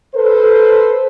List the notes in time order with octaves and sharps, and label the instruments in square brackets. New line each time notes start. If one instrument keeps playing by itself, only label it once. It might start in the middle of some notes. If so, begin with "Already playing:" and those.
[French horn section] A4 B4 C5